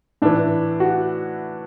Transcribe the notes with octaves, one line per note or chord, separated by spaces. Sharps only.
A2 E3 D4
F#4